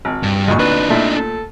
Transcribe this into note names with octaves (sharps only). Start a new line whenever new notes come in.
G#1
G2
D2 A#2 G#3 C#6
D4 D#4 B4
A#2 A3 E4 A5
A4